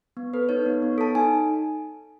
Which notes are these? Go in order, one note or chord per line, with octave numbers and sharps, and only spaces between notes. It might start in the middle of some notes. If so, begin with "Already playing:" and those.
B3
A4 B4
D#4 C#5
B3
B3
A4 A5
D#4 G#5